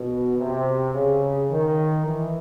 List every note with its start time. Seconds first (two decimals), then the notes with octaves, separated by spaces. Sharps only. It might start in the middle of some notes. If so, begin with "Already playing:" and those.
Already playing: B2
0.37 C3
0.93 C#3
1.50 D#3
2.06 E3